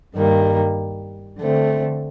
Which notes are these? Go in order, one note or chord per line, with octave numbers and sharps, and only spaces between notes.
G2 D#3 G3 A#3
D3 A3 C4